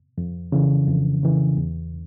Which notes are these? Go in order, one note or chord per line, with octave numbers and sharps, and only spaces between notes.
F2
C#3 E3
F2
C#3 E3
E2